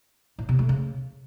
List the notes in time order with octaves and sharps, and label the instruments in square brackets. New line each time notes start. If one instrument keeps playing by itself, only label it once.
[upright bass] A2
C3
A3
C#3